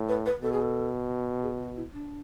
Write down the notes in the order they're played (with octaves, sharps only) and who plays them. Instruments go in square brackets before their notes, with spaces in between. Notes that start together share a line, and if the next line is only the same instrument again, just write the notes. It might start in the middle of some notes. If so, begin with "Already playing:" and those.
Already playing: [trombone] A2
[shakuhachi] B4
B4
[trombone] B2 [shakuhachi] A4
[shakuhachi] G#4
A4
G#4
F#4
E4
D4